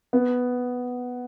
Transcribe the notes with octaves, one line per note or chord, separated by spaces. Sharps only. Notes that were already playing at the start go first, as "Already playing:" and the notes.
B3